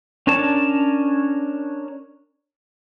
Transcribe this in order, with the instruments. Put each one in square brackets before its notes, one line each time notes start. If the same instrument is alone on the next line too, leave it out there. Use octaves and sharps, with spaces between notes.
[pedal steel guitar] C#4 D4 A#4 C#5 A5